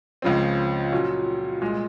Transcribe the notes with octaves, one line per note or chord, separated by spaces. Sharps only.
C#2 C#3 F3 C4
A#2 F#3 C#4
C2 A#2 G#3